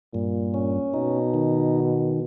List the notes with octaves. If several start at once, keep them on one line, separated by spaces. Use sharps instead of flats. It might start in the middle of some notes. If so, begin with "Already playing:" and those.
G2 A#2
C#4
B2 D#4
D#3